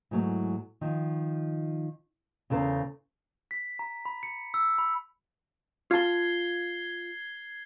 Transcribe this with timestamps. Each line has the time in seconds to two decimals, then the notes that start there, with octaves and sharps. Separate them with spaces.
0.11 G#2 E3 F#3 A3
0.81 D#3 F3
2.50 E2 C#3 A4 A#4 C5
3.51 B6
3.79 A#5
4.05 B5
4.23 C#7
4.54 E6
4.78 B5
5.91 F4 A5 G#6 C7 G7